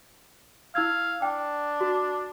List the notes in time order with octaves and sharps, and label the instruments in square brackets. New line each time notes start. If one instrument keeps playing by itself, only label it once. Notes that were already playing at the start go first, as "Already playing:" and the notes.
[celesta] E4 E6 G#6 [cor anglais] F5
[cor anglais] D4 [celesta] G5
[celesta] F#4